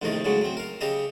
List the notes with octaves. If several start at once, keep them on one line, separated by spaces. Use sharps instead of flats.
A#1 F2 A2 C3 D#3 D#5
A2 C#3 F#3 G#3
F#3 C4
A#4 F5
C#3 G4 D#5 E5 A#5